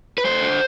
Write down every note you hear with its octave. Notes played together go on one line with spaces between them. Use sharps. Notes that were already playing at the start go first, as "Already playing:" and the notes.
B4
A3 C5
D3